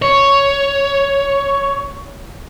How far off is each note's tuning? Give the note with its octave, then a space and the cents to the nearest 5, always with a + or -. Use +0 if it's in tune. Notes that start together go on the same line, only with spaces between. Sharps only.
C#5 +5